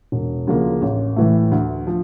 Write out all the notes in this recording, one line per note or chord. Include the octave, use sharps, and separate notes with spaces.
E1
D2 C#3 F3 A#3
A1
A2 E3 A3
D2
F3